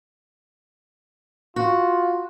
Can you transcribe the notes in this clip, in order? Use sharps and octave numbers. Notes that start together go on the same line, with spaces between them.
F4 F#4